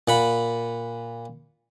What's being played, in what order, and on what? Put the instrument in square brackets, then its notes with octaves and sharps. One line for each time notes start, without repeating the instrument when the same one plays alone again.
[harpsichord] A#2 F#5 B5